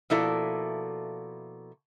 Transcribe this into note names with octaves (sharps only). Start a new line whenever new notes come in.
B2 F3 A#3 E4 A4 D5